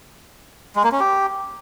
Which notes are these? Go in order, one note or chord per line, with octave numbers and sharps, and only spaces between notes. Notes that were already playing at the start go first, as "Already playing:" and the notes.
G#3
A#3
C#4
G4